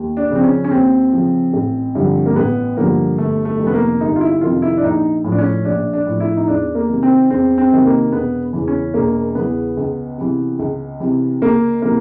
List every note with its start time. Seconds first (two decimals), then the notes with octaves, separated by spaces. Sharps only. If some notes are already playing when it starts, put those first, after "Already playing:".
Already playing: D#2
0.17 D4
0.31 C#3 F3 C4
0.43 C#4
0.64 C#4
0.71 D#2 C4
1.12 C#3 F3
1.53 A1
1.95 G2 D3 F3
2.26 A#3
2.36 A1 B3
2.77 G2 D3 F3 A#3
3.18 G1 A3
3.45 A3
3.59 F2 C3 D#3
3.67 B3
3.74 A#3
4.01 G1 D#4
4.16 F4
4.21 E4
4.41 F2 C3 D#3 F4
4.62 E4
4.78 D4
4.83 A#1 D#4
5.24 A2 F3
5.32 D4
5.38 C#4
5.65 A#1 D4
5.93 D4
6.07 A2 F3
6.20 E4
6.36 D#4
6.47 E2 D4
6.75 A#3
6.89 C3 D#3
7.03 C4
7.30 E2 C4
7.58 C4
7.72 C3 D#3
7.84 A#3
8.12 E1 B3
8.53 E2 C#3 E3
8.68 C#4
8.94 E1 A#3
9.35 E2 C#3 E3 B3
9.77 C#2
10.18 C3 E3
10.59 C#2
11.00 C3 E3
11.41 C#2 A#3
11.82 C3 E3 A#3